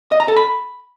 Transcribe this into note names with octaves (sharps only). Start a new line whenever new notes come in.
D#5
A#5
A4
B5